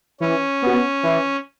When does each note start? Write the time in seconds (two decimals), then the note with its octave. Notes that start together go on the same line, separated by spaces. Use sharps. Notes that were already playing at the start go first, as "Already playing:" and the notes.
0.20 E3 C#4
0.62 B3 F#4
1.03 E3